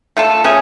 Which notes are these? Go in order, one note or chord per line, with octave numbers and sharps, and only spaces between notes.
A3 F4 A4
A3 C#4 G#4